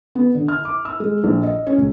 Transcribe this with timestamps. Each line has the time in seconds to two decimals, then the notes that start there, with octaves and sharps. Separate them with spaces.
0.15 B3
0.35 D3
0.48 F6
0.65 D6
0.85 E6
1.00 G#3
1.24 A#1
1.43 D#5
1.67 C#4
1.78 C#2